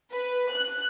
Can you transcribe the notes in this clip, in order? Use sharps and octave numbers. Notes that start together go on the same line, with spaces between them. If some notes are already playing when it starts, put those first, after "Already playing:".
B4
F#6